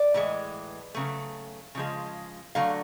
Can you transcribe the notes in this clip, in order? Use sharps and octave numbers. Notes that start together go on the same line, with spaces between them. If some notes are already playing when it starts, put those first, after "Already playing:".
Already playing: D5
A2 E3 G#3
C#3 F#3 A3
C#3 F3 G#3
D3 F#3 A3 F5